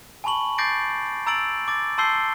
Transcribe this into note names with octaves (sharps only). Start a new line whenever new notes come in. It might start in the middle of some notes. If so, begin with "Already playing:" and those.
G#5 A5 B5 C#6 F#7
D6 G6 A6 A#6 C7 D7
A#5 E6 A6 D7 F#7
D6 A6
A5 C6 E6 G6 C7 G7